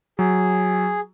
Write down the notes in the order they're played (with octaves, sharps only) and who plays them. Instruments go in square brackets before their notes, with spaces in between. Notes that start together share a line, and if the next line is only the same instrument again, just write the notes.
[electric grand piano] F#3 [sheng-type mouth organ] G#4